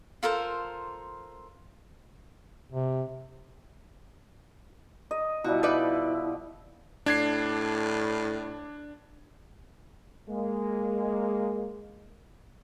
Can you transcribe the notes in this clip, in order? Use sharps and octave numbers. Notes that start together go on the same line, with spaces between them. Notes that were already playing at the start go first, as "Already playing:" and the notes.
F4 A4 A#4 C5
C3
D#5
B2 F3 G3 E4 F#4
D#4 B4 D5
A2 D4 G#6 C7
G#3 A#3